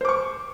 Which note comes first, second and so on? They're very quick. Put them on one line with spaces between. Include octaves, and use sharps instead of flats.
C5 D6 C#6